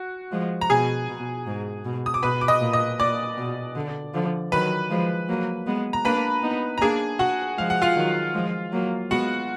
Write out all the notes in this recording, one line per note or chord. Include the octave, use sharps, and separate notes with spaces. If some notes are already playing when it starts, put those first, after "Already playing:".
Already playing: F#4
F3 G#3
A#5
B2 G#4 G#5
B2
G#2
B2
D#6
D6
B2 B4 B5
D6
D#5 D#6
A#2
D#5 D#6
A#2 D5 D6
B2
D3
D3 F3
D#3 F#3 B4 B5
F3 G#3
F#3 A#3
G#3 B3
A#5
A#3 D4 B4 B5
B3 D#4
A#5
A#3 D4 G#4 G#5
F#4 F#5
F3 G#3 F5
F#5
F4 F5
D#3 F#3
F3 G#3
F#3 A#3
G#3 B3 F#4 F#5